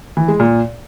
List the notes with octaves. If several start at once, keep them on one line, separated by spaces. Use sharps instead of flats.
E3
G#3
A#2